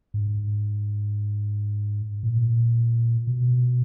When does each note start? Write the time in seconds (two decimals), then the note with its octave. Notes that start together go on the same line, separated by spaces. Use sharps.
0.14 G#2
2.23 A#2
3.27 B2